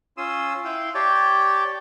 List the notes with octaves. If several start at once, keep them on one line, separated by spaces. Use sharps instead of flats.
C#4 F4 C6 D#6 E6
E4 F5 G5 C6
G4 C#5 D5 G5 A5